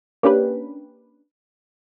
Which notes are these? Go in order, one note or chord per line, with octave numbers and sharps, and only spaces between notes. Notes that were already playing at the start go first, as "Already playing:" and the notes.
A#3 C#4 D4 G4 B4